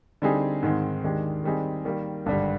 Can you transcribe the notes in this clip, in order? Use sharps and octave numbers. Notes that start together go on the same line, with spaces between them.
D3 G3 C4 D#4 G#4
G#2 D#3 G#3 C4
D#2 D#3 G#3 D4 G4
D#3 G3 C4 D#4 G#4
D#3 G3 A#3
G#1 G2 D3 G3